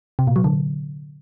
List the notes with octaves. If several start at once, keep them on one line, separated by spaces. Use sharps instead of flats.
C3
A#2
F#3
D3